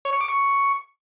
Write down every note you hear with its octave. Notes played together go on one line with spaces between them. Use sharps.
C#5
C#6
D6
C#6